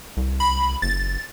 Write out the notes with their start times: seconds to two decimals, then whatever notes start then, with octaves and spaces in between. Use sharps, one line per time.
0.17 C2
0.40 B5
0.82 F#1 A6